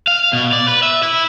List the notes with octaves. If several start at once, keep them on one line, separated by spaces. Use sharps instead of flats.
F5
B2
D5
B4
E5
E4